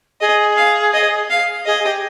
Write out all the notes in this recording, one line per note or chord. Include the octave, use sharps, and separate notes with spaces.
G#4 D#5
F5
D#5
F5
G#4 D#5
G4